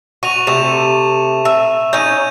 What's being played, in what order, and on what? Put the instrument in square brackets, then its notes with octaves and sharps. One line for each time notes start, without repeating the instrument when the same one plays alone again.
[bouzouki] F#4 [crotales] C#6 D#7 F7
[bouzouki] C3 A3 [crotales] E7
[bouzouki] E5
[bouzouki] C#4 D#4 [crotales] G6 D#7